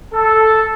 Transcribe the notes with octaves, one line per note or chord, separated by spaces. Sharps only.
A4